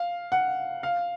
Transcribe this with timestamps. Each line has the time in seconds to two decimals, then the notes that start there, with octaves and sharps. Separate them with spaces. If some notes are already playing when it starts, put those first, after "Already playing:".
Already playing: F5
0.32 F#5
0.83 F5